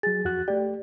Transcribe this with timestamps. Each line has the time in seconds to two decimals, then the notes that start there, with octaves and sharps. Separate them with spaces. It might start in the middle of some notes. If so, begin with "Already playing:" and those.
0.03 F#3 G#4 A6
0.25 F2 F#4 F#6
0.48 A3 G4 D5